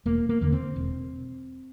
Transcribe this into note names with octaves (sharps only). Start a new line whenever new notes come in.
E1 A#3
A#3
E2 D3 A#3
C4
E1